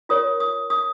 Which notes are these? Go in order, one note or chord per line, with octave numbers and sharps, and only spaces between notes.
F4 A#4 C#5 D#6
D#6
D#6